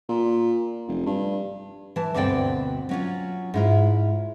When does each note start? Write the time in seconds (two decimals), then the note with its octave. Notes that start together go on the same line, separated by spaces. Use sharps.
0.09 A#2
0.88 F1
1.06 G2
1.96 E3 A5
2.14 D2 G2 B2 C4 D5 G5
2.89 F#3 C#4 F4
3.54 G#2 E4 F4